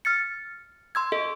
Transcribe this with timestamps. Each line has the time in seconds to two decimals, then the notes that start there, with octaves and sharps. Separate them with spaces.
0.05 F6 A6 C#7
0.95 C6 E6 G#6
1.12 A4 D#5